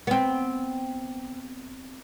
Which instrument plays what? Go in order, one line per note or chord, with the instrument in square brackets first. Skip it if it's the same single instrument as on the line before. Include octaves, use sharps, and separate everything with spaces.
[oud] B3 C4